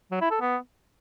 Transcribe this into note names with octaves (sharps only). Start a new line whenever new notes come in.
F#3
E4
A4
B3